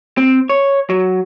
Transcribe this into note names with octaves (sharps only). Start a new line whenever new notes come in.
C4
C#5
F#3